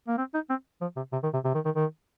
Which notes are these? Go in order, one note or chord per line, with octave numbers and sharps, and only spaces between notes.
A#3
C4
D#4
C4
F3
C3
C3
D#3
C3
C3
D#3
D#3
D#3